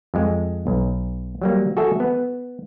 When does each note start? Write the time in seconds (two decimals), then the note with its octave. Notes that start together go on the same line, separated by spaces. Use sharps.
0.14 F2 G#3
0.67 B1
1.42 F#3 G3 A#3
1.77 F#4 G#4 A4 E5
2.00 B3